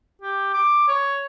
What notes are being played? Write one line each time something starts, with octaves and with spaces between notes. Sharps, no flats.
G4
D6
C#5